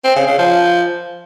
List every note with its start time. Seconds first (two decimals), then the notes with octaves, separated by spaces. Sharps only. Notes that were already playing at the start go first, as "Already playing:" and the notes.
0.04 C4
0.16 C#3
0.27 C#3
0.38 F3